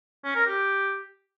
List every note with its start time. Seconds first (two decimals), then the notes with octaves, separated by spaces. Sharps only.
0.24 C#4
0.35 A#4
0.47 G4